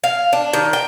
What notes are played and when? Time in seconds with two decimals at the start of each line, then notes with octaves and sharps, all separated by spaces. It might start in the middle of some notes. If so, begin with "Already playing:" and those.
0.04 F5
0.33 D4
0.53 D#3
0.73 G5